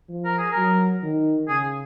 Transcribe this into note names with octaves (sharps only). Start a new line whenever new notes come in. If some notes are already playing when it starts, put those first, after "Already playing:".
F3
A#4
G#4
F#3 A#4
D#3
C#3 G#4